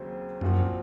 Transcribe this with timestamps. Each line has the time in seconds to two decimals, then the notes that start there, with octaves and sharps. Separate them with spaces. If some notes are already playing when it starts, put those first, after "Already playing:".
Already playing: D#2 C#3 F#3 C4
0.41 F#2 A#2 F3 C4 F#4